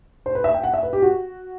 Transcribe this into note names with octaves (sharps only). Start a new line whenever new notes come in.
C5
B4
E5
G5
F#5
E5
B4
G4
F#4